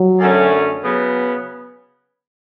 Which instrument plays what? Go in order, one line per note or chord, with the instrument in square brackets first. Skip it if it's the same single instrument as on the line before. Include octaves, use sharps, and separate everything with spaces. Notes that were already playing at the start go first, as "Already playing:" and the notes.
Already playing: [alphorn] F#3
[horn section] F#2 D3 A3 C#4
C#3 F#3 B3